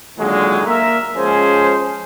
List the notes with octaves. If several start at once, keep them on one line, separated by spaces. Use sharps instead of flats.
A#2 D3 D#3 F#3 G#3
A#3 A#4 E5
F3 G#3 C#4 G#4 C5